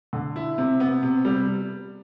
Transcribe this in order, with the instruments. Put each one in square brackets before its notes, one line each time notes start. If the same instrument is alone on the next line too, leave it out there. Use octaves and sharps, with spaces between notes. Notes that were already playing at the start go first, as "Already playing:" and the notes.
[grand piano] D3
E4
C3
B3
C3
G3